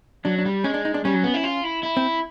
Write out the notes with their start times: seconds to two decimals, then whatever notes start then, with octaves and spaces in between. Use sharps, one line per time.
0.25 F#3 D4
0.38 D4
0.46 G3
0.64 G#3 C#4
0.74 D4
0.85 D#4
0.94 D4
1.05 G3 C#4
1.14 F#3
1.23 B3
1.34 E4
1.44 F4
1.64 E4
1.83 E4
1.97 C4